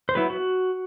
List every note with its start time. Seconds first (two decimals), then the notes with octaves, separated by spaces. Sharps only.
0.09 C5
0.15 F#3 B3 E4 B4
0.30 F#4